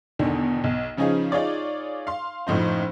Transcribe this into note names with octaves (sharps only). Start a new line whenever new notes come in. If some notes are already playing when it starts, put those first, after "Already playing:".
E2 B2 D3 D#3
B1
C#3 F3 C#4 D#4 F4 G#4
D#4 F4 G#4 C#5 D5
F5 C6
F#1 A2 F3 D#4 C5